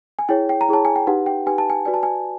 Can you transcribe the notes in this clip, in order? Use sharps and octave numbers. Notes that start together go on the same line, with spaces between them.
G#5
E4 G#4 C#5 G5
G5
A#5
E4 G#4 C#5 A5
G#5
G5
D#4 G4 B4 F#5
G5
D#4 G4 B4 G#5
A5
G#5
F#4 B4 D5 G#5
A5
G#5